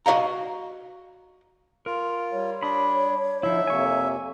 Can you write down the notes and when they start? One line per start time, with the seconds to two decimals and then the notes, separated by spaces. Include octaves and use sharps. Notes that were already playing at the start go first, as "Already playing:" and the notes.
0.06 F#4 D#5 F5 A#5
1.86 F4 A#4
2.32 G3 C#5
2.63 D4 B5 D#6
3.43 D3 F3 D#4 E4 E5
3.67 F2 C3 A#3 G#5 C#6